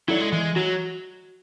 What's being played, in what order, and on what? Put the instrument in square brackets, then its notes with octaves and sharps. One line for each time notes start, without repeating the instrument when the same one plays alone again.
[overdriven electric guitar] F#3 [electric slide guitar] E4 A4 D5
[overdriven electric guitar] G#3
[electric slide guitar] E3 [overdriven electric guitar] G#3
[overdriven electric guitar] F#3 [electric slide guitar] F#4